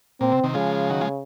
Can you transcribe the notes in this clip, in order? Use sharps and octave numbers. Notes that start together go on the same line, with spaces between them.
A#2 C4
C3
C3 D#3
C#3 F3 G#3
D#3 F#3
F3 G#3